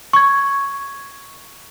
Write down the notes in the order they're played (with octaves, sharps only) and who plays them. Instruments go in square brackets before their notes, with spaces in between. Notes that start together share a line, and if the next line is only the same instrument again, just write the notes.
[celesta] C#6 G#6